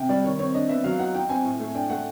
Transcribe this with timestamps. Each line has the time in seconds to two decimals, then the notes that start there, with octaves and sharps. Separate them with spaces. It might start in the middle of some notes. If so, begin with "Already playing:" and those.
Already playing: C3 G5
0.09 G3 D5
0.24 D#3 C#5
0.39 C4 C#5
0.54 D4 D#5
0.69 B3 E5
0.84 F#3 F5
0.99 D#4 F#5
1.14 D#4 G5
1.29 C4 G#5
1.45 A2
1.60 A3
1.75 D4 G5
1.90 A3 F#5